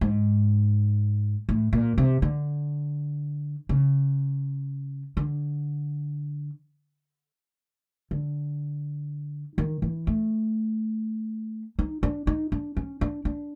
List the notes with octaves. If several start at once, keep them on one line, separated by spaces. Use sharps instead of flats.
G#2
A2
A#2
C3
D3
C#3
D3
D3
D#3
E3
A3
D#4
D4
D#4
D4
C#4
D4
D4